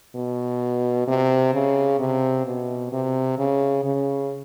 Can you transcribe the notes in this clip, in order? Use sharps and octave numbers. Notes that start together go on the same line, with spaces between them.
B2
C3
C#3
C3
B2
C3
C#3
C#3